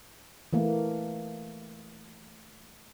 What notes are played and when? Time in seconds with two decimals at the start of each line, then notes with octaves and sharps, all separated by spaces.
0.53 E3 A3 A#3